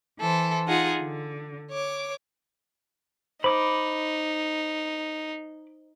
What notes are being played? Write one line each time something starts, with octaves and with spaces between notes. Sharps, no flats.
E3 A4 C5
D#4 F4 G#4 F#5
D3
C#5 D6
D#4 C5 B5 D6